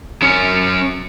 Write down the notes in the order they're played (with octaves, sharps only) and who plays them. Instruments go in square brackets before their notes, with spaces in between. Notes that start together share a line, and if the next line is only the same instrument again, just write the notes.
[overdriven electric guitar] F#3 C#4